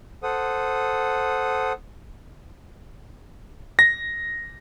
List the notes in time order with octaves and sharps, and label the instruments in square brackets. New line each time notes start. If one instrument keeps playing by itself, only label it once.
[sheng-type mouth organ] A4 C5 F#5 D#6
[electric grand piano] A#6